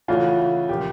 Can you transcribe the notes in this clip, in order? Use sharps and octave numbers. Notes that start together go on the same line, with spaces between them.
C#3 E3 A3 C#4 F4 F#4
C#3 F3 A#3 G4